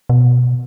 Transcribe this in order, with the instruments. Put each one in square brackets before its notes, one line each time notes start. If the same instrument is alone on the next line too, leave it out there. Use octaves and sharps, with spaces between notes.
[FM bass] B2